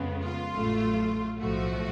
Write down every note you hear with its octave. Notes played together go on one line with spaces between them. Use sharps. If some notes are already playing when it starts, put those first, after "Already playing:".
Already playing: F2 C#3 G#3 B3
F4
A1 A2 F#3 A3
B1 A2 F3 A3 F#4